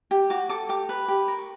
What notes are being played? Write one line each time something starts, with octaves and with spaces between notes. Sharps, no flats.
G4
F#4 D6
A4 D6
G4 D6
B4
G4
A#4
C#6